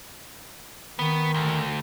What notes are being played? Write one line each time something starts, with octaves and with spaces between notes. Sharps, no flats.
D#3 B3
D2